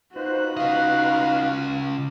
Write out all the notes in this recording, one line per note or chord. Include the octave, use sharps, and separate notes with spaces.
D#4 F4 F#4 B4 C5 F#6
C#3 D#5 F5